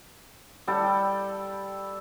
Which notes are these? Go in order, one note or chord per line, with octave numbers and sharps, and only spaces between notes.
G3 A4 G5